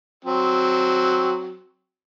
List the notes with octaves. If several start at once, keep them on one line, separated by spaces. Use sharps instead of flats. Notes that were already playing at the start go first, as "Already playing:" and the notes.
F#3 C4